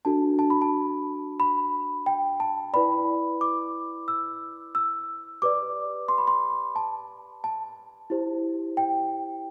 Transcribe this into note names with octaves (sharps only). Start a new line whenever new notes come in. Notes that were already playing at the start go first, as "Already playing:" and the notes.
D4 F#4 A4 A5
A5
B5
A5
B5
G5
A5
E4 B4 D5 B5
D6
E6
E6
G4 B4 D5 D6
C6
B5
C6
A5
A5
E4 G4 C5
G5